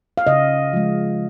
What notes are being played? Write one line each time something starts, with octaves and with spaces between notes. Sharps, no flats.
F5
C#3 D#5
F3 G#3